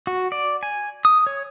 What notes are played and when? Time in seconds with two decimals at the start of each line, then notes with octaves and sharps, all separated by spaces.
0.07 F#4
0.32 D5
0.63 G#5
1.05 D#6
1.27 C#5